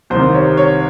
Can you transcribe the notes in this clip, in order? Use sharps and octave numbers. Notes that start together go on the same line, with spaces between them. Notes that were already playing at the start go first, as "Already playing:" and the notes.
C2 C3 D#3 C5
C#5
C#5